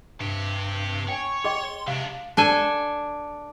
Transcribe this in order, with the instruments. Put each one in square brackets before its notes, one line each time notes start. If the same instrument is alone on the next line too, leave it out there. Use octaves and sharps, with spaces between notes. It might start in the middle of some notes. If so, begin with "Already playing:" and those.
[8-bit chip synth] G2 [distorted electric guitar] C3 G4
[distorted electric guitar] C#5 [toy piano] G5 G#5
[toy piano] G#4 D#5 G5 [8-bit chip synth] C6
[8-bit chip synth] C3 [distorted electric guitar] G#3 D4 [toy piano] F5
[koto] D4 A4 G#5